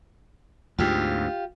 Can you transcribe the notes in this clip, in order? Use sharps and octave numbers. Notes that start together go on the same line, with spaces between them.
D2 G#2 F4 G4